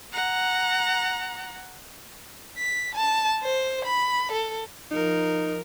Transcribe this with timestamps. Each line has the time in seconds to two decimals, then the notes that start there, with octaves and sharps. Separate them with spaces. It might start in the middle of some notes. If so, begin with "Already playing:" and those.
0.13 F#5 A#5
2.58 B6
2.95 A5
3.43 C5
3.85 B5
4.32 A4
4.91 F3 D#4 A#4